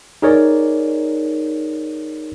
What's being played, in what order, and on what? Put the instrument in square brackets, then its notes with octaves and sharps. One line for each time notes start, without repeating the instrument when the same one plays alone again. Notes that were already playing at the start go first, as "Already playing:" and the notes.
[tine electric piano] D#4 G#4 A#4 C#5 D5